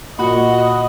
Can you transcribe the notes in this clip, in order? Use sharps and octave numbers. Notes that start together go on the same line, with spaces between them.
A#2 F#4 D#5 B5